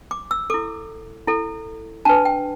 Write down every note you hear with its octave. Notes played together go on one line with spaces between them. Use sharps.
D6
E6
E4 A4 D6
E4 A4
D4 B4 A5
G5